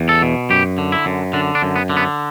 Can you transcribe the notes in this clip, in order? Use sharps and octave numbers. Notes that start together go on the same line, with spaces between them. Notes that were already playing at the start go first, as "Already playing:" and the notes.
Already playing: E2
A4
B2
F#2 G4
D3
E4
F#2
D3 D4
D4
F#2
B3
D3
B3